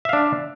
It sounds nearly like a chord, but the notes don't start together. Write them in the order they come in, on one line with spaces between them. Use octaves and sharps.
E5 F5 D4